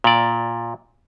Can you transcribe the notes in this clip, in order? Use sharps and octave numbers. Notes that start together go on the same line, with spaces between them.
A#2 D5